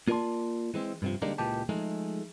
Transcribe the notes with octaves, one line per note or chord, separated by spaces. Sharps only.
A#3 F4 A#4 D5 A5 C6
E3 G#3 C4
G2 C3 F3
D3 G3 G#3 A#3 D4 D#4
C#2 A#2 E3 G#3 G4 A5
F3 G#3 A3 D#4 G#4